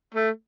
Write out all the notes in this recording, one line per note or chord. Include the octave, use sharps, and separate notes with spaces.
A3